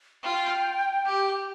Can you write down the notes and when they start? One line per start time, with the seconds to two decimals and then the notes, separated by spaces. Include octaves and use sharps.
0.23 F4 G5
1.05 G4